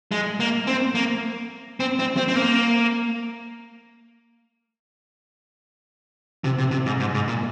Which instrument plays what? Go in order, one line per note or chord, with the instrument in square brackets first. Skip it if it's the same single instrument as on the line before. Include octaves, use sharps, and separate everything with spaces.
[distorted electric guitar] G#3
A#3
C4
A#3
C4
C4
C4
C4
A#3
C3
C3
C3
G#2
G#2
G#2
A#2